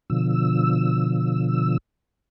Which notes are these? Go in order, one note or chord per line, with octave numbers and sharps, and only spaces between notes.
B2 D3 F3 E6